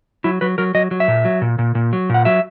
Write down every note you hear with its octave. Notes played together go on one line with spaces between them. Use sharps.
F#3 E4
F#3 B4
F#3 A#4
F#3 D#5
F#3
E5
A#2
F#3
A#2
A#2
A#2
F#3
A#2 F#5
F#3 E5